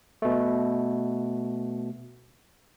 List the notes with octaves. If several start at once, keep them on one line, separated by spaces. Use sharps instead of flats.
B2 A3